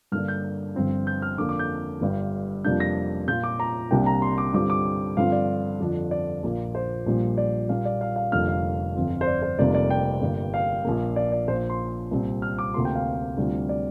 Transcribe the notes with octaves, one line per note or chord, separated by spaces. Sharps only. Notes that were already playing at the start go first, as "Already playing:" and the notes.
G2 D3 A#3 D4 F6
G6
G1 G2 F3 C4 F4
G6
F6
F2 D3 A#3 D4 D6
D6
G6
G1 G2 G3
F2 C3 G3 A#3 D4 G6
A#6
A#2 A#3 F4 G6
D6
A#5
C2 C3 G3 A#3 D4 G5
A#5
C6
D6
G2 D3 G3 C4 F4 D6
D6
G2 D3 F3 C4 F4 F5
D5
F2 D3 F3 D4
D5
A#1 A#2 A#3 F4
C5
A#1 A#2 G3
D5
A#2 G3 A#3 F4 F5
D5
F5
F5
F1 F2 D3 G3 A#3 F6
F5
G1 F2 F3 C4 F4
C5
D5
C5
F1 F2 C3 G3 A#3 D5
D5
G5
G1 G2 G3 A#3
F5
A#1 A#2 A#3
D5
D5
A#1 A#2 A#3 C5
C6
C2 A#2 G3 C4
F6
D6
D2 C3 A#3 F4 C6
G5
F5
D2 C3 G3 D4 F4
D5